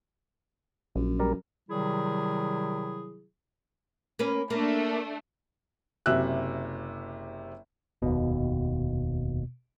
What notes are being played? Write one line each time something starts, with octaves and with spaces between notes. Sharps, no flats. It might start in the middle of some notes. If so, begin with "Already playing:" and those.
A#1 F#2
G3 A#4 D5
C3 D#3 F#3 G3 E4 G#4
A#3 C#4 B4
A3 A#3 D4
F#1 C3 E5 E6 F#6
F1 D#2 B2